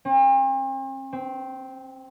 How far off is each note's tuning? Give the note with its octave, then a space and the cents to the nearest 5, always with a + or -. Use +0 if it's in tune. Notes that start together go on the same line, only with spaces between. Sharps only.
C4 +45
C4 -10